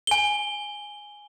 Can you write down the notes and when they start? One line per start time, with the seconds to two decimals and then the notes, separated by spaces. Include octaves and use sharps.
0.07 G#5 G7